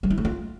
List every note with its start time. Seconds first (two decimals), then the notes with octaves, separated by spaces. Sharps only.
0.03 G3
0.10 E4
0.18 A3
0.25 F4